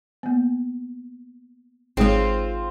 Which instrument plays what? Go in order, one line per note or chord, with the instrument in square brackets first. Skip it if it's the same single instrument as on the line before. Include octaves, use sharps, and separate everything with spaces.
[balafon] A#3 B3
[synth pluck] G#1 G#3 [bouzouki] C4 F4 [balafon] D#4 G#4 C#5